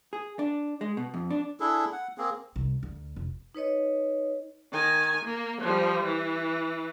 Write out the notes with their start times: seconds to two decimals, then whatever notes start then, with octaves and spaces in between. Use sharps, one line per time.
0.13 G#4
0.39 D4
0.81 G#3
0.97 B2
1.14 F2
1.31 D4
1.60 D4 E4 G#4 A4
1.92 F#5
2.18 A#3 C4 G#4
2.56 C2
2.83 D2
3.16 F1
3.55 D#4 B4 C#5 D#5
4.73 D#3 G#5
5.25 A#3
5.62 F3 G3
6.05 E3